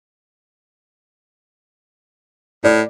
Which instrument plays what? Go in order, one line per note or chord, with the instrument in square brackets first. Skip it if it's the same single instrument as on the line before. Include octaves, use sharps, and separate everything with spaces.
[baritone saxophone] A2 [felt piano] D5